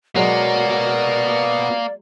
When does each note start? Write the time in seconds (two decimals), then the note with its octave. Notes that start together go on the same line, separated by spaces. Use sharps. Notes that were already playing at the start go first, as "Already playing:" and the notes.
0.16 F#3 G#3 A#3 B3 F#4 D5 D#5